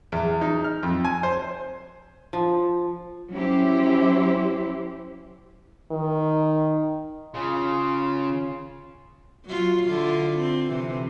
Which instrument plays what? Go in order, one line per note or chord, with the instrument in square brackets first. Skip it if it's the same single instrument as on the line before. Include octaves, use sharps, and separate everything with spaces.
[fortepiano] E2
D#4
F6
F2
G#5
C5
[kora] F3
[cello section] F#3 C#4 E4 G4 C5
[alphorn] D#3
[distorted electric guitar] C#3 [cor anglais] F4
[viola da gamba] F#3 F4
D3 E4 F4
C4
C3 E3